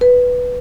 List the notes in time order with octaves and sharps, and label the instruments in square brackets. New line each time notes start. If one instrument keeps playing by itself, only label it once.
[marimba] B4